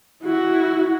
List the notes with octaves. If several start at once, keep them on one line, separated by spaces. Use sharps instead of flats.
E4 F#4